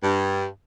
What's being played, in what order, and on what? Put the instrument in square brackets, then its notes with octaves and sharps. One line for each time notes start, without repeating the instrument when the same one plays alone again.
[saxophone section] G2